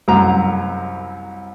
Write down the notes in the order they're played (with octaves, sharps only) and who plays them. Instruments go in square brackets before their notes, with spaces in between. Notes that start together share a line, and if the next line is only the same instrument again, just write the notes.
[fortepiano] C2 F#2 A#5